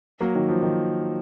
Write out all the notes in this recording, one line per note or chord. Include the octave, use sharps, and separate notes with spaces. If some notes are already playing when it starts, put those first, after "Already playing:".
F#3 A#3
D#3 F#3
F3
D#3